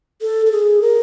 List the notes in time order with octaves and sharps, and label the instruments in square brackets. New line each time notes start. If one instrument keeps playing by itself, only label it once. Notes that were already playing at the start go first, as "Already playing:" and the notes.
[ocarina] A4
A4
G#4
A#4